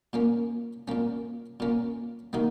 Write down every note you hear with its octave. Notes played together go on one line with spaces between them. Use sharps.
A#2 A#3 C#4
A#2 A#3 C#4
A#2 A#3 C#4
D#3 A#3 D#4 F#4